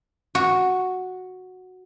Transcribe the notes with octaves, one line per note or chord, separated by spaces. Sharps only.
F#4